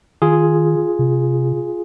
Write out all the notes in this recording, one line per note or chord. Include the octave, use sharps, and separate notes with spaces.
D#3 F4 G#4
C3